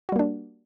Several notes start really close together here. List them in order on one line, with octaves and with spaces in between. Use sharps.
F#4 G3 A#3 D4